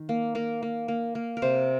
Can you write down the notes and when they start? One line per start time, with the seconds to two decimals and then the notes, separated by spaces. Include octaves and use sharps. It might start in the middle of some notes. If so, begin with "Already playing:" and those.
Already playing: D#3
0.09 A#3
0.35 A#3 A#4
0.62 A#3
0.88 A#3
1.15 A#3
1.37 A#4
1.42 C3 C5